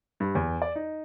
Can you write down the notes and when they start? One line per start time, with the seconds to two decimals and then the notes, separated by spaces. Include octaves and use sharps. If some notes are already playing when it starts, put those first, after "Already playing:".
0.20 G2
0.35 E2
0.62 D5
0.75 D#4